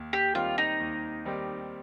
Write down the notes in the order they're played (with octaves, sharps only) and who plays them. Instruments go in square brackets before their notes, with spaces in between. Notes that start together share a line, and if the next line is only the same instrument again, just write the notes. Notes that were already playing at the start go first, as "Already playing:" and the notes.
Already playing: [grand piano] D#2
[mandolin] G4
[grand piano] D#3 G3 C4 G4 [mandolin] F4
[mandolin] D#4
[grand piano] D#2
D#3 G3 C4 G4